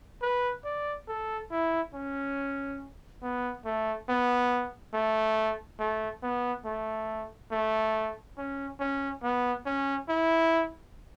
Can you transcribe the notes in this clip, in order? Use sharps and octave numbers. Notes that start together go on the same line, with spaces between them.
B4
D5
A4
E4
C#4
B3
A3
B3
A3
A3
B3
A3
A3
C#4
C#4
B3
C#4
E4